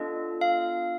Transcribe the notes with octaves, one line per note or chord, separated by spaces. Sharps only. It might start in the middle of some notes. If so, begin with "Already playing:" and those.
Already playing: B3 D4 F4 A4 D#5
F5